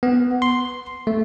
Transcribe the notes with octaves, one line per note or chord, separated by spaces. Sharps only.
B3
C6
A3